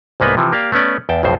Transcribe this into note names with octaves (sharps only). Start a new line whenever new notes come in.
C2 G#2 A#3 B3 B4
C3 E3 F3
A#3 G4 D5 F5
A3 B3 C#4 D5
E2 G5 A5
B1 F2 A2 C5